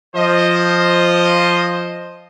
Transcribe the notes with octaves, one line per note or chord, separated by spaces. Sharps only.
F3 C5 D#5